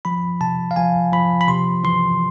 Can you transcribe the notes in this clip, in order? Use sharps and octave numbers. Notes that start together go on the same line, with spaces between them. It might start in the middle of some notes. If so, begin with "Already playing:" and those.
F3 B5
C3 A5
F5
F3 G#5
F3 B5
B5
C3 C6
E3 C6